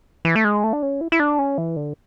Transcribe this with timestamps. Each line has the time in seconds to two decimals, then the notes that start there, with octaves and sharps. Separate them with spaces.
0.25 E3
0.36 A3
0.45 G#3
0.64 A3
0.73 D4
0.82 C#4
1.01 E4
1.12 E4
1.20 D4
1.39 C#4
1.58 E3
1.76 D3